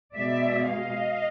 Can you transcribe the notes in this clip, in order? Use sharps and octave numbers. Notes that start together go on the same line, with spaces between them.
B2 G#3 D5 E5
D#5 F5